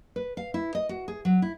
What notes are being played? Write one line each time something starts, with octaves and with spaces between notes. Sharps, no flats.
B4
F5
E4
D#5
F#4
G#4
F#3
E4